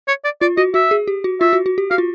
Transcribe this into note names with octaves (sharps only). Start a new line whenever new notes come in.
C#5
D5
F4 D5
F#4 D#5
F#4 E5
G#4
G4
F#4
F4 E5
F#4
F#4
G4
F#4 F5
F4